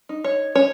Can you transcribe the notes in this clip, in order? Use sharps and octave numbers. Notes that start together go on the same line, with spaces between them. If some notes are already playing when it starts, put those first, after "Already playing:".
D#4
C#5
C#4 C#5